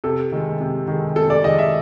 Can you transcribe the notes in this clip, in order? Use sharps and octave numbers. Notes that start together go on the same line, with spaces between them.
C3 A4
D#3 G#3
C3
D#3 G#3
C3 A4
D5
D#3 G#3 D#5
E5